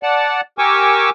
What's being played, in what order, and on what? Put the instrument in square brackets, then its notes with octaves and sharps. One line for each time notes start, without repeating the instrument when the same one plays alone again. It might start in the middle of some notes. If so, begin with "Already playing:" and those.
[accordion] D5 F#5 A5
G4 A#4 G#5 C#6 D6 E6